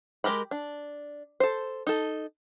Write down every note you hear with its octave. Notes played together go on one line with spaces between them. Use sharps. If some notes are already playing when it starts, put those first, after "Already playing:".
G#3 A#3 G4 A#4 B5
D4
A4 C5
D#4 A4